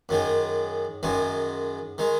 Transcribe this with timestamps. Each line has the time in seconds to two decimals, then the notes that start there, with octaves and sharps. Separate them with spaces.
0.09 F#2 D#3 G#3
1.03 F#2 D#3 G#3
1.98 D#3 G#3